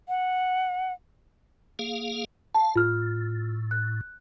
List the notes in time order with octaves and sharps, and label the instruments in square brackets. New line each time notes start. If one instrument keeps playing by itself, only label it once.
[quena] F#5
[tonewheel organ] A#3 G#4 F5
[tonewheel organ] F5 [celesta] A5
[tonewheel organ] A2 [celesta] F4 F6
[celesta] F#6